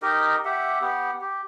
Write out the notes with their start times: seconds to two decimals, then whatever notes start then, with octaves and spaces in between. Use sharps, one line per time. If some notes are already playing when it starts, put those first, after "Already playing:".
0.02 D#4 G4 A#4 D#5
0.45 G4 E5 F#5
0.81 B3 G4 F#5
1.21 G4